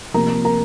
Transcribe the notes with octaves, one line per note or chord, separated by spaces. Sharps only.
C3 F3 A#3 A#4 A#5
A#4 A#5